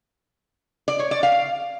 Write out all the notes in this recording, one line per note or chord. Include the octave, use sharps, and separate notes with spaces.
D5
C#5
D5
F5